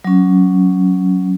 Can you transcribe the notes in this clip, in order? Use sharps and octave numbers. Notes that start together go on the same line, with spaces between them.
F#3 C#4